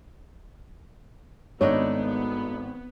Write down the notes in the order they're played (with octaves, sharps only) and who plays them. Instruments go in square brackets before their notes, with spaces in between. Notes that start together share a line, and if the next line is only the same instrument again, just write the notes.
[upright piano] G#1 [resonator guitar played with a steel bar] A3 D4 D#4 [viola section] B3 [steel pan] C#5